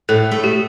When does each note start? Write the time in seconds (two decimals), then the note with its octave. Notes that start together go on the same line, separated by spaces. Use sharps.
0.09 A2 A4
0.32 A3
0.44 G4